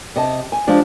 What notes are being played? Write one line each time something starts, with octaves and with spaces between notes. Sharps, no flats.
C3 D#5 A5
G#5
F3 G#3 D4 G4